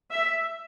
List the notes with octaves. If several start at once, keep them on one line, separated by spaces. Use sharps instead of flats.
E5